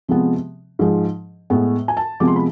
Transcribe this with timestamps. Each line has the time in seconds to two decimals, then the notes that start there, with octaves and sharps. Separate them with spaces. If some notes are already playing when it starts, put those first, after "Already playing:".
0.09 C3 F3 G#3 B3
0.79 G#2 F3 G#3
1.50 A2 G#3 B3
1.88 G#5
1.97 A5
2.20 C3 F3 G#3 B3 D6
2.27 C6
2.36 B5